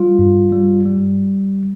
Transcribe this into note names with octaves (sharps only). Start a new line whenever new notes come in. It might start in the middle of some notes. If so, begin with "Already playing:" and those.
Already playing: G3 F4
G2
G3
G3